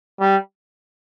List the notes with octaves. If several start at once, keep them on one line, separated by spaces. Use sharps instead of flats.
G3